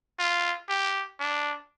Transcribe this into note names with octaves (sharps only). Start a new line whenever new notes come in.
F4
G4
D4